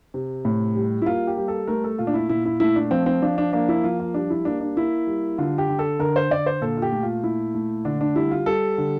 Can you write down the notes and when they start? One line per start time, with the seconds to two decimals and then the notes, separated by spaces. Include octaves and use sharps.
0.14 C3
0.45 A2
0.75 G3
1.02 E4
1.06 A#3 F4
1.27 G4
1.37 G3
1.48 A4
1.67 A3 A#4
1.84 A4
1.98 A#2 F4
2.07 D4
2.14 E4
2.29 A#2 E4
2.45 E4
2.60 A3 E4
2.76 D4
2.91 F3 C4
3.06 C4
3.22 F3 D4
3.38 D4
3.53 A#3 D4
3.69 E4
3.84 F3 F4
4.00 F4
4.14 G3 D4
4.30 E4
4.45 A#3 D4
4.61 D4
4.76 A#3 E4
5.07 G3
5.38 D3 F4
5.58 G4
5.69 D3
5.79 A4
5.99 D3 A#4
6.16 C5
6.30 D3 D5
6.46 C5
6.61 A#2 A4
6.77 F4
6.82 G4
6.92 A3
7.03 F4
7.23 A#2 E4
7.55 A3
7.85 D3 D4
8.01 D4
8.15 G3 E4
8.31 F4
8.46 G3 A4
8.78 D3